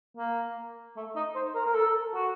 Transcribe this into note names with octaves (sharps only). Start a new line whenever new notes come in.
A#3
A3
D#4
C5
A#4
A#4
A4
F#4